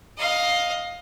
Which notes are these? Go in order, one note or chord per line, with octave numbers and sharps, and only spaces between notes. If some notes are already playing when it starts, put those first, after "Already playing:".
D#5 F5